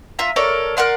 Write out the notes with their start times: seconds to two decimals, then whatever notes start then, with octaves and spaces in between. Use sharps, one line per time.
0.19 F4 E5 A#5
0.36 A4 A#4 C#5 D5
0.77 A#4 D5 F#5 C6